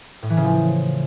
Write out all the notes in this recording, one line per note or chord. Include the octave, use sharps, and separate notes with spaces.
A2
E3
C#3
F3